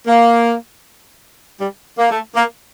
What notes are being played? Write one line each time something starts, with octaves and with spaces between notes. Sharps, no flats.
A#3
G3
A#3
A3
A#3